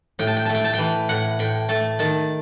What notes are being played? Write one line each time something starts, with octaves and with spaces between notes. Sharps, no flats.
A2 G5
A5
G5
A3 A5
G5
A5
E3 G5
A2 F#5
A2 G5
A3 A5
D#3 A5